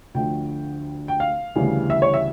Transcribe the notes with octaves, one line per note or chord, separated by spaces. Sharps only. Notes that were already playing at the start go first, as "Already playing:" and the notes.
D2 D3 F3 A3 G5
G5
F5
D2 C#3 E3 G3
E5
C#5
E5